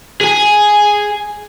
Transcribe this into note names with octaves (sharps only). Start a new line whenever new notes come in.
G#4 G#5